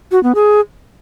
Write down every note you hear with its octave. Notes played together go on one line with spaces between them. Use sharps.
F#4
B3
G#4